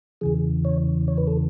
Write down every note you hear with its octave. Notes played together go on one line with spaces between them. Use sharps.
E2 C#3 E3 G#4
C#5
C#5
B4
A4